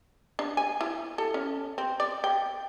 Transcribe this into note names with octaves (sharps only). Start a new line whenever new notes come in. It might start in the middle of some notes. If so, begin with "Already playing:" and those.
D4
G#5
E4
A4
C#4
C4
D5
G5